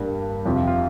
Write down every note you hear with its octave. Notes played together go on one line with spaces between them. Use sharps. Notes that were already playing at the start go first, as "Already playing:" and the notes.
Already playing: G2 G3 A#3
F2 C3 F3 G4
F4
F4